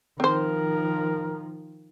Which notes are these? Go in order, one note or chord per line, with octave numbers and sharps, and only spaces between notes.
D#3 F3 C4 A#4 C5